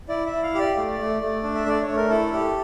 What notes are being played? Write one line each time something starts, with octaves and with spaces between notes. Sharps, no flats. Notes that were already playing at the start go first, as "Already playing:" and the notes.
E4 D5
E4 E5
F5
G4
D5
A3
A3
A3
D4
E5
A3 D5
C#5
A3
A#4
E4 A4
G4